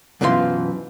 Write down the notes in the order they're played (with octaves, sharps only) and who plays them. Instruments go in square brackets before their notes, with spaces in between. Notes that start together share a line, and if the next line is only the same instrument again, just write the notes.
[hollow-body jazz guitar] F#2 B2 E3 F3 F#4 C6